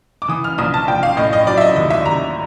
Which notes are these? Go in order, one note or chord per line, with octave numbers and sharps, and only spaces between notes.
D6
E3 D#6
F6
A#1 D#6
A5
A#1 G5
F5
A2 D#5
D#5
F#3 D5
E5
D#5
D#2 D#5
E5
D#2 A#5